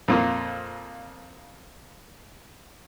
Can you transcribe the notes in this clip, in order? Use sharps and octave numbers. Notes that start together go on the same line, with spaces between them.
F2 A#2 A#3